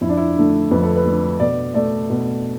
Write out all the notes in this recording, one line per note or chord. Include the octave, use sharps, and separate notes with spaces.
F2 E4
D4
E4
D3 A3
F2 B4
A4
B4
D3 A3
B2 D5
A3 D5
B2